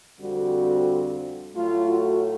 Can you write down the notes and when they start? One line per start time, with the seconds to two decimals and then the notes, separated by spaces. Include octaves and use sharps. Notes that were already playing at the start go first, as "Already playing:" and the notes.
0.19 F2 D3 G3 C4 F#4
1.53 A2 F#3 A3 F4
1.87 F#4